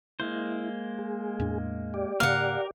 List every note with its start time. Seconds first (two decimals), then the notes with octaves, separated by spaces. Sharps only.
0.20 G#3 A#3 E4 C5
0.99 G#4
1.40 E2 A2 D4
1.94 G4 D5
2.20 G#2 C#3 A#3 A#4 F5 F#5